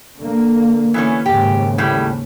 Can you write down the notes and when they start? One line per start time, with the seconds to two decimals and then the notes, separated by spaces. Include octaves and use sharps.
0.18 D3 A#3
0.94 E3 B3 C#4
1.26 D#2 G#2 C#3 G4
1.78 A2 G3